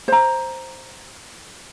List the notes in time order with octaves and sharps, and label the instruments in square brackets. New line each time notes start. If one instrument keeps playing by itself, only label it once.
[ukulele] C5 A#5